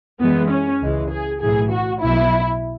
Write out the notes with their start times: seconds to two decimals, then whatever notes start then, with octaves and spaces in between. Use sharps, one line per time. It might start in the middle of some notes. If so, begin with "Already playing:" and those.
0.20 F#2 E3 G#3 B3
0.51 C#4
0.81 C#2 C#3 E3 G#3
1.11 G#4
1.41 B1 A2 E3 G#4
1.71 F#4
2.01 B1 B2 F#3 E4